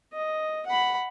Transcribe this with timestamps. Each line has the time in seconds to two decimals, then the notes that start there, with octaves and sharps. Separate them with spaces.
0.13 D#5
0.67 F#5 B5